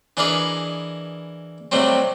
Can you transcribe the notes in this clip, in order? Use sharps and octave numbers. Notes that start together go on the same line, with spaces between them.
E3 D4 G#4 A#4 B4 D#5
C3 F#3 G3 A3 C4